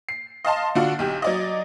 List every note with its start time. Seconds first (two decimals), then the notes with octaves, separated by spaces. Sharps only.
0.09 C7
0.45 D#5 F5 A5 C6
0.75 D3 D4 F4 F#4
0.99 B1 G4
1.22 F#3 D5 D#5